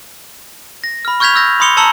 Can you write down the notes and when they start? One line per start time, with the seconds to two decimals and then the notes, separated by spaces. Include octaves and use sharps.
0.84 A#6
1.05 B5 F6
1.20 C#6 F6 G6 G#6 B6 F7
1.35 E6 F6 G6 A#6
1.60 B5 C6 D#6 C#7 F7 G7
1.77 A5 A#5 E6 C#7 F#7 G7